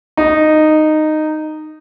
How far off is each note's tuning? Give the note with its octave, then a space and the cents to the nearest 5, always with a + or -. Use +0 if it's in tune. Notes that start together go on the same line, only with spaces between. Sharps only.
D#4 -10